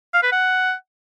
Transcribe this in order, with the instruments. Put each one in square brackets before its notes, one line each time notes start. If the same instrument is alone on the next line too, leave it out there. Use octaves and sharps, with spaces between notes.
[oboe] F5
B4
F#5